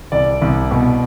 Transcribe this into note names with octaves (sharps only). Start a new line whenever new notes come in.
C2 D5
C2
B2